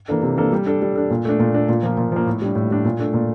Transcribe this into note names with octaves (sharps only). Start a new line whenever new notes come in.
E3 A#3 D4 A4
C3
E3 A#3 D4 A4
G3
D4 A4
G3
D4 A4
A#2
A3 D4
A#2
A3 D4
A#2
F3 A#3
A#2
F3 A#3
A2
G3 D4
A2
G3 D4
A#2
A3 D4
A#2